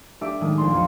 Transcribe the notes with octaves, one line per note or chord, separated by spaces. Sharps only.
A3 D4 G4 E5 D6 D7
A2 D#3 G#3 A3
A#1 D4 C6
F2 C#7